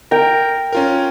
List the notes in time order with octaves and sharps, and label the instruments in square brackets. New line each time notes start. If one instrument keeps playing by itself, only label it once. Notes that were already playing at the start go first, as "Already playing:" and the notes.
[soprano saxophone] A#4 [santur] G5
[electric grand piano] C#4 F4 A#4